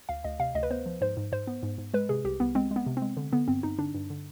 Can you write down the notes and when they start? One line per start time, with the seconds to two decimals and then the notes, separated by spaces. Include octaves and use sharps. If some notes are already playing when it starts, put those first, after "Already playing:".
0.09 D2 F5
0.24 D2 D#5
0.40 C3 F5
0.55 D2 D#5
0.63 B4
0.70 B3 C5
0.86 F3
1.01 G#2 C5
1.17 G#2
1.32 G#2 C5
1.47 B3
1.63 G#2
1.78 G#2
1.94 G#3 B4
2.09 C3 G#4
2.24 C2 G4
2.40 C2 B3
2.55 G#3 C4
2.71 G#3
2.76 B3
2.86 C3
2.97 C4
3.02 G#3
3.17 D3
3.32 D3 B3
3.48 G2 C4
3.63 G2 D#4
3.79 D3 D4
3.94 G2
4.10 D3